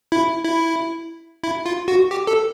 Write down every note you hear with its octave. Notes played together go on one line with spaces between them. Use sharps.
E4
E4
E4
F4
F#4
G4
A4